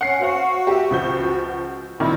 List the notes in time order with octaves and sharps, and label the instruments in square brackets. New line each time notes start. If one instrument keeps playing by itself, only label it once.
[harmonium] C#4 [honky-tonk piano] F#5 C7
[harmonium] F#4 [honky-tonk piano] C5 F5 F#5
[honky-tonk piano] G4 E5
C#2 F3 G6
[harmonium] D2 E4 [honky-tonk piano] A#2 D#3 A#3